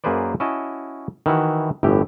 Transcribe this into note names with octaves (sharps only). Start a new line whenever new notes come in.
F#2 A#3 G#4 B4 C5 D5
C#4 E4 F#4 D#5 A5
D#3 E3 E4 F#4
G1 A2 E3 G4